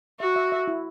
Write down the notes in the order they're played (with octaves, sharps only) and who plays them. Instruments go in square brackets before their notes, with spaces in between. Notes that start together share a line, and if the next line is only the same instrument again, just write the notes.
[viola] F#4 [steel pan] E5
[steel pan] E5
E5
E4